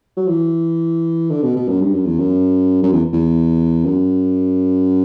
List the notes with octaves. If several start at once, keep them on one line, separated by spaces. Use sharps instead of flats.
F#3
E3
D3
B2
B2
F#2
G2
F#2
E2
F#2
F#2
E2
E2
F#2